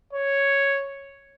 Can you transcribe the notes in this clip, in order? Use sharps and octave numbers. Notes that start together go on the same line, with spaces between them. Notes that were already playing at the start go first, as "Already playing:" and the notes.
C#5